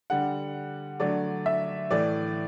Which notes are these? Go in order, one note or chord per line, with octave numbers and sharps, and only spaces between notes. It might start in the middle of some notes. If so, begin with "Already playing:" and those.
D3 G3 F#5
D3 F#3 A3 D5
E5
A2 E3 A3 D5